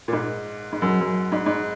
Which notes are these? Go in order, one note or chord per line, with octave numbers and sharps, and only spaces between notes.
A#2
G#2
G#2
F#2
F#2
G#2
G#2